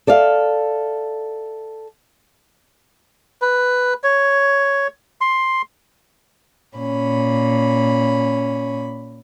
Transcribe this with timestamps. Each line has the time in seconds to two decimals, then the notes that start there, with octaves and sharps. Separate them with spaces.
0.07 A4 D5 E5 F5
3.42 B4
4.03 C#5
5.21 C6
6.77 A#2 C#4 B5